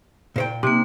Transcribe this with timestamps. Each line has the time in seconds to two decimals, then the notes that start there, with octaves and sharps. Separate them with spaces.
0.36 A#2 C5 G5
0.63 C3 A#3 D#4